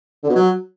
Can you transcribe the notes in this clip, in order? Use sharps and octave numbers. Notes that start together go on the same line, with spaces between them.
D3
B2
F#3